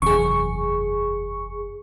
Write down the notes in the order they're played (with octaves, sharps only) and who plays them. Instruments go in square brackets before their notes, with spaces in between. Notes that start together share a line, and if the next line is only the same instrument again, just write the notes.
[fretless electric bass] F#1 E2 C3 [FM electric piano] G#4 C#6